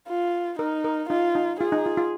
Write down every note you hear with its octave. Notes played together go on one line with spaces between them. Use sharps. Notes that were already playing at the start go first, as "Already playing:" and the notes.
F4
D#4 A#4
A#4
D#4 F4
D#4
F4 G#4
D#4
F4
F4